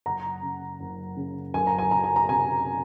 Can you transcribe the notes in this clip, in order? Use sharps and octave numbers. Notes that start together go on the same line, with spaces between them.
F#1 F#5 A#5
C#3
F#1
C#3
F#1 G#5
A#5
G#5
F#1 A#5
G#5
A#5
C3 G#5